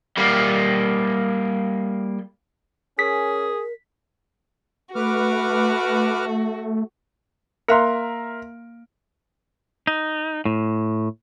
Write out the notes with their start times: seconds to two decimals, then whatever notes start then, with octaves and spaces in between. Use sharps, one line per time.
0.17 G3 A#3
2.99 C#4 G#4 A#4 B6
4.95 A3 F#4 B4 D6 F6
7.68 A#3 A#4 E5 F5 C6 F#6
9.87 D#4
10.45 A2